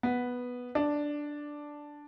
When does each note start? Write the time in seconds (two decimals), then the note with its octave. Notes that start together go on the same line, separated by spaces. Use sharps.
0.03 B3
0.75 D4